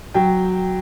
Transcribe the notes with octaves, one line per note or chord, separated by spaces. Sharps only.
F#3 G5